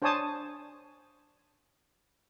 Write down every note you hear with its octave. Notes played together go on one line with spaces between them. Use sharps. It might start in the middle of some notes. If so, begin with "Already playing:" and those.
D4 C5 C#5 G#5 A5 D#6